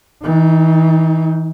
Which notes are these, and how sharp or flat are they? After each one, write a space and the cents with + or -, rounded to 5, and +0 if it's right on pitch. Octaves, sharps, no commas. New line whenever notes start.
E3 -35 D#4 +0